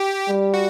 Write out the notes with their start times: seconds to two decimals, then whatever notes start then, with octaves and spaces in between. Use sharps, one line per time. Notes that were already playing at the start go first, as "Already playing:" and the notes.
Already playing: G4
0.28 G3
0.54 F#4